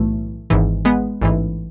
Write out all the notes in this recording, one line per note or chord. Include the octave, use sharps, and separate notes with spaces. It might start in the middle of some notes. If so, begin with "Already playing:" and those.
Already playing: B1 A2 E3 A3
G#1 G#2 E3
G#3 B3
A1 G#2 E3